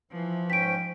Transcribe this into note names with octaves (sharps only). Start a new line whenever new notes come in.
E3 F3
G#2 C#4 G5 B6 D7